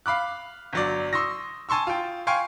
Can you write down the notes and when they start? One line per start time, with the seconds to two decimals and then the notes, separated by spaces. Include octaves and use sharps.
0.06 F5 B5 D6 F#6
0.73 G1 F#3 D5
1.13 C6 C#6 D#6 E6 A#6
1.69 G#5 A5 C6 C#6 E6
1.87 F4 G5
2.27 F5 G5 G#5 C6 C#6